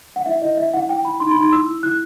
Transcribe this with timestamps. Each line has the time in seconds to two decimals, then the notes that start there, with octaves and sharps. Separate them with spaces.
0.16 F#5
0.26 E4 E5
0.42 E4 D#5
0.57 E4 E5
0.73 E4 F#5
0.89 E4 G5
1.05 E4 B5
1.20 D#4 C6
1.31 B5
1.36 D#4 C6
1.52 E4 E6
1.68 E4
1.83 E4 F#6